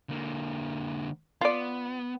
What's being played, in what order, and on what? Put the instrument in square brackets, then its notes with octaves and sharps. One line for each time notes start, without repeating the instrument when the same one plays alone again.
[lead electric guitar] D3 A#3
[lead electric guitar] B3 [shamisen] F4 D5